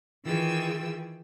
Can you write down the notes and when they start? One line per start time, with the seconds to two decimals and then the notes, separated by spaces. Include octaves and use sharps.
0.23 D#3 E3 F4 G#4 G5 E6